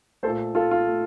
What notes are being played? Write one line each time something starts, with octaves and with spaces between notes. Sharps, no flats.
A#2 A3 A4 C5
F4 A4
F4
A3